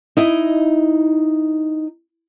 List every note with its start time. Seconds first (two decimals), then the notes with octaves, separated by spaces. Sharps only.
0.17 D#4 E4 D#5